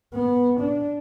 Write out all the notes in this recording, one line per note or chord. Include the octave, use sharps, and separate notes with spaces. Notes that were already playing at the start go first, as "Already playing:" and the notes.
B3
D4